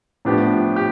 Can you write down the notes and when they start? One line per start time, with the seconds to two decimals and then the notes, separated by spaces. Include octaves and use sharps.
0.25 A2 F3 B3 D4 G4
0.76 G4